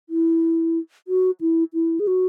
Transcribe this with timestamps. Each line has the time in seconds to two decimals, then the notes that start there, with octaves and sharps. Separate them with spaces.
0.09 E4
1.08 F#4
1.41 E4
1.74 E4
2.00 G#4
2.07 F#4